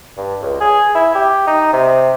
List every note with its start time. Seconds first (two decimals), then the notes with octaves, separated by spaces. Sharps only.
0.17 G2
0.42 C#2
0.61 G#4
0.95 E4
1.15 G4
1.47 D#4
1.73 C3